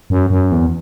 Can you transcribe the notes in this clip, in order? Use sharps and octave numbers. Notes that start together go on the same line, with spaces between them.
F#2
F#2
E2